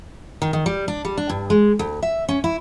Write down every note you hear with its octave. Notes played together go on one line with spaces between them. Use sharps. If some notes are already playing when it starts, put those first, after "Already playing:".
D#3
D#3
G3
D4
G3
D4
G2
G#3
D2
E5
C#4
E4